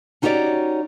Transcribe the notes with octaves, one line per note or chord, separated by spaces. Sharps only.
C#4 D#4 F#4 G4 C#5 D5